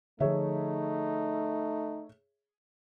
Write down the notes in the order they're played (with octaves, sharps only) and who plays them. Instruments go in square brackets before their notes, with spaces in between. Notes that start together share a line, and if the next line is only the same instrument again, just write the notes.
[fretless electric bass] D3 F3 [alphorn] A3 [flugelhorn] D#4 [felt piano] G#4 C#5 E5